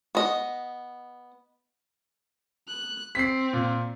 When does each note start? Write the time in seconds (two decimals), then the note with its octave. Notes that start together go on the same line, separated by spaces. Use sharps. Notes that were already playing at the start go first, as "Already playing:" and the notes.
0.15 B3 D#5
2.68 F#6
3.15 C4 B6 C7
3.53 A#2